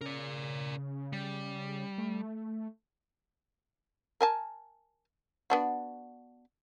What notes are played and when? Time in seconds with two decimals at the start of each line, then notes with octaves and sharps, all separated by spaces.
0.01 C#3 A#4 D5
1.13 G3
1.98 A3
4.21 A#4 G#5 A5
5.50 B3 D4 F#4